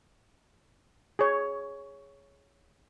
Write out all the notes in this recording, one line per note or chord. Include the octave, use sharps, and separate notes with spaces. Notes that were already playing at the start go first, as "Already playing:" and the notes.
G#4 C#5